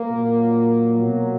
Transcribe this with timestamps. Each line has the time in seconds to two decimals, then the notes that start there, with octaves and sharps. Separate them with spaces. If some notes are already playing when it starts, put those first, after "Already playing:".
Already playing: A#3
0.11 A#2 F#3
0.99 F#3
1.04 B2